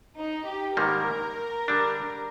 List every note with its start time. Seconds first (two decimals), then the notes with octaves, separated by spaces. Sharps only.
0.17 D#4
0.47 G4
0.77 G#2 D#3 G3 A#3 A#4
1.68 D3 G3 D4